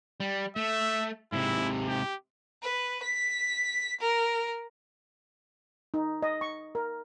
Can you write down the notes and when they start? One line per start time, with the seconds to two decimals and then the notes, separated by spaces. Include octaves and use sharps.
0.20 G3
0.56 A3 E5
1.32 G#2 C3 E4
1.88 G4
2.62 B4
3.03 B6
4.01 A#4
5.94 D#4
6.22 D#5
6.41 C#6
6.75 A#4